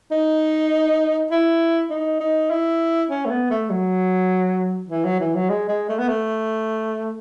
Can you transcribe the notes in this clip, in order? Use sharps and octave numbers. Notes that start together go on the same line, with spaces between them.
D#4
E4
D#4
D#4
E4
C#4
A3
B3
A3
F#3
E3
F#3
E3
F#3
G#3
G#3
A3
B3
A3